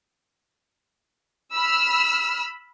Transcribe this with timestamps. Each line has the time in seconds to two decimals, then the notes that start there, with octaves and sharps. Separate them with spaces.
1.56 B5 E6 F6